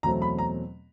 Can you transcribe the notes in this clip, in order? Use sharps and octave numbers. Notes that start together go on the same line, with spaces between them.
E2 B2 F#3 A3 C4 A#5
B5
A#5